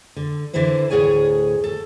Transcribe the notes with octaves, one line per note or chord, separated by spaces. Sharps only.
D3
D3 E3 E4 B4 C5
D2 A2 E3 G#4 C#5 G#5
A4